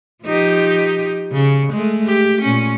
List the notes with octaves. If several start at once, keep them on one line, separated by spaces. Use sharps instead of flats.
F3 D#4 G4
C#3
G#3 A3
G4
A#2 C#4